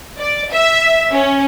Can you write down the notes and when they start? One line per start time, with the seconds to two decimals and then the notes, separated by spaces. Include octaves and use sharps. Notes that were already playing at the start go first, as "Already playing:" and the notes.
0.18 D5
0.52 E5
1.12 C#4